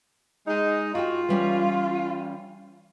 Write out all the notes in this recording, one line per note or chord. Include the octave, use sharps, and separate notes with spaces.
G#3 D#4
F4 F#4 G5
E3 G3 C#4